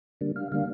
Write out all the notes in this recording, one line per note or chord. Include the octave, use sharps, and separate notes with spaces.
D3 G3 A#3 D4
F5
D3 G3 A#3 D4 F5